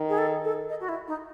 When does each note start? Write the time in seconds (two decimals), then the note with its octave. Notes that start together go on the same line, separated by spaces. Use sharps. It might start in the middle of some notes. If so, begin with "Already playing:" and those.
Already playing: D#3
0.09 G#4
0.18 A4
0.44 A4
0.69 D#5
0.81 F#4
0.89 E4
1.08 D#4